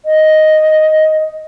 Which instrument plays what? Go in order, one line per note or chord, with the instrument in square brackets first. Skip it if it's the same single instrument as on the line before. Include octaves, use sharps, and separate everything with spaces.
[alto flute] D#5